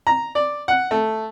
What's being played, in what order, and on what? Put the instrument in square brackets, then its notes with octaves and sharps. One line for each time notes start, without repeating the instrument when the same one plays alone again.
[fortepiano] A#5
D5
F#5
A3